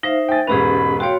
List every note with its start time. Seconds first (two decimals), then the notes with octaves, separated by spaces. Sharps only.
0.03 D#4 C5 E5 F5 A#6
0.28 G5 G#5 A6
0.47 E1 G#2 C#4 G4 G#4 B4 B5
1.00 F#4 C#5 F5 G5 C6